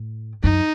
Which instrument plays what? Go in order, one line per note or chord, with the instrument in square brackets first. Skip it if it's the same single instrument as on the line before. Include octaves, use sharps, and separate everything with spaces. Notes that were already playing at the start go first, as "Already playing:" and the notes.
Already playing: [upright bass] A2
[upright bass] F#2 [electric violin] D#4